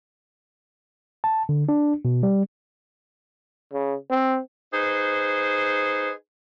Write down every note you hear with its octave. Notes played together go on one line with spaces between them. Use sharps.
A5
D3
D4
B2
G3
C#3
C4
D#4 G#4 B4 C5